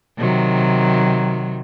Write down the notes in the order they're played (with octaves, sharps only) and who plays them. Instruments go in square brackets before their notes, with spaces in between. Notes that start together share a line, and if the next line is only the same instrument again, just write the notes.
[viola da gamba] C3 D#3 F#3